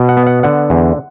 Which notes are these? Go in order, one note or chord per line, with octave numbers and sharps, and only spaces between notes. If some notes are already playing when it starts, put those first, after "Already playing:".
Already playing: B2
F#5
B3
F#5
D3 F#5
E2